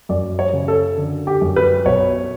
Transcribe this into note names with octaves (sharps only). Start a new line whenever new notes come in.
F#2 D5
C#5
C#3
A4
D3
G4
F#2
B4
B1 C#5